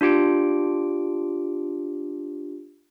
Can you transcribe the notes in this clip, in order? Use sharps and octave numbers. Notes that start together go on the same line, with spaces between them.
D4 F4 G4 D7